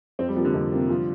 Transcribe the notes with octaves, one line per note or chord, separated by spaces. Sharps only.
F2 C4
G3
C3 F3 A#3 G4
D3
F2
C3 A#3 G4
F3